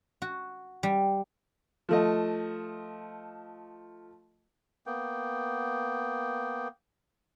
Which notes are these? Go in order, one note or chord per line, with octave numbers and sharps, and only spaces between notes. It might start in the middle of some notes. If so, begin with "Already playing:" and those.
F#4
G3
F3 A3 D#5
A#3 B3 G5